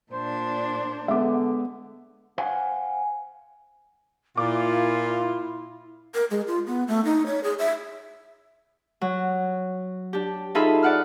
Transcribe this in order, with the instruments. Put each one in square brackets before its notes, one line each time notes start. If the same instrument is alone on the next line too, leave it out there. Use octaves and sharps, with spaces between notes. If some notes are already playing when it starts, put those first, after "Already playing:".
[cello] A#2 D4 [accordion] C5
[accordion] D3 [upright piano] G#3 B3 [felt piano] E5 D6
[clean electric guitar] C5 F5 F#5 G#5
[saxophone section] A#2 [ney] E4 [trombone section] F4 [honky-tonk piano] D6
[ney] A#4
G#3
F4
B3
A3
D#4
C#5
G#4
E5
[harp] F#3
D4 G4
D#4 F4 G#4 A4 E5 B5
D5 F#5 F6